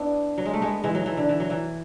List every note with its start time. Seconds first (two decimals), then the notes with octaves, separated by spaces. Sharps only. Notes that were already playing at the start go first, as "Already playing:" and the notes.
Already playing: B3 D4 E4
0.38 F#3
0.46 G#3
0.54 A3
0.62 G#3 B3
0.84 E3 G#3
0.95 F#3
1.06 E3
1.17 D3
1.29 E3
1.40 F#3
1.50 E3